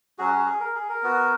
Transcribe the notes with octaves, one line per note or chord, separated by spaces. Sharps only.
F#3 C#4 F#4 G#4
F#4
G#4
A#4
G#4
A#4
B3 F#4